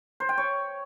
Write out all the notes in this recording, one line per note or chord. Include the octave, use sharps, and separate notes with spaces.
C5
G5
C#5